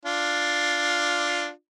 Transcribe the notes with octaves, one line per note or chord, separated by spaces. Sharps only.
D4 F4